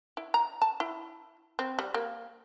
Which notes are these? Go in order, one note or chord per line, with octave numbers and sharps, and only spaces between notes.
E4
A#5
A5
E4
C4
G3
A#3